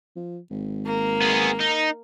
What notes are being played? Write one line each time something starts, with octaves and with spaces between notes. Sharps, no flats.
F3
G#1
A#3
B3 G#4
D#4